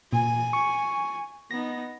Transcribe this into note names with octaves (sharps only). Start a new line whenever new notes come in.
A#2 G#5
C#6
B3 D#4 A#6